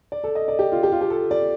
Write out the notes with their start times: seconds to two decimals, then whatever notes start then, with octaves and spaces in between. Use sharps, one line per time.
0.12 D5
0.24 A4
0.35 D#5
0.48 D5
0.59 G4
0.72 F4
0.83 G4
0.92 F4
1.01 G4
1.10 A4
1.31 D5